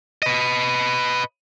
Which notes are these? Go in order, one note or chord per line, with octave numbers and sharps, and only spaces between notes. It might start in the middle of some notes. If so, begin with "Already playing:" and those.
B4 D#5